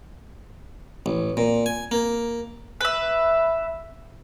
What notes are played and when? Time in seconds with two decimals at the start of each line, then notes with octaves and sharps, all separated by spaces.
1.06 A1
1.37 A#2
1.66 G#5
1.91 A#3
2.81 B4 E5